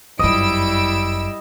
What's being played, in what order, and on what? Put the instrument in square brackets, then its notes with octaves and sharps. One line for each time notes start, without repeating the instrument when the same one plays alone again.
[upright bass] G1 F#2 [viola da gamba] G3 E4 [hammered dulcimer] D#5 [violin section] E6 D7